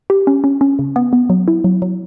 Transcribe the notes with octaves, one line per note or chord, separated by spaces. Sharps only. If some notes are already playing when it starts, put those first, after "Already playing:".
G4
C#4
C#4
C#4
C#3
B3
B3
F#3
E4
F#3
F#3